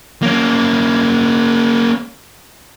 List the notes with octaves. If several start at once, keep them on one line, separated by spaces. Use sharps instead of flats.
A#3 C#4